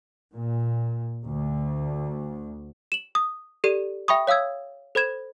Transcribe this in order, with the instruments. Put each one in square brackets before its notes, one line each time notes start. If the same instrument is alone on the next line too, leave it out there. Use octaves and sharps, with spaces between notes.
[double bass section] A#2
D2
[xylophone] E7 F#7
D#6
G4 A4 D5 C7 D#7
E5 G5 B5 C#6 D#6
C#5 F5 D#6 E6 G#6
A4 C5 B5 G#6 E7